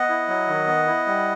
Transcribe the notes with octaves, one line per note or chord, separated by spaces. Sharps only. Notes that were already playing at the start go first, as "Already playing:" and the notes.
Already playing: B3 D#5 F#5
E4
F#3
D#3
B3
E4
G3